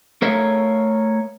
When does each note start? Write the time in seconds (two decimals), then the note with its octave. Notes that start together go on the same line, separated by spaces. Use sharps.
0.22 A3 A#4 C#5 E5 F5